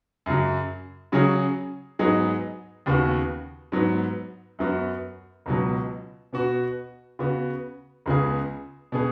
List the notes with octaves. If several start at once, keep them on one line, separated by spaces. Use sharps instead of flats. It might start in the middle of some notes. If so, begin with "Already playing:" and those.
F#2 C#3 F#3
C#3 F#3 C#4 G#4
G#2 F#3 B3 D#4 G#4
D#2 C#3 B3 F#4
G#2 F#3 B3
F#2 F#3 B3 F#4
C#2 B2 F#3
B2 B3 F#4
C#3 B3 F#4
C#2 C#3 B3 G#4
B2 B3 G#4